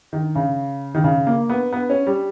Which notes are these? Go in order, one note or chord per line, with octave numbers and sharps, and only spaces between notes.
D#3
C#3
D#3
C#3
A#3
B3
B3
C#4
G3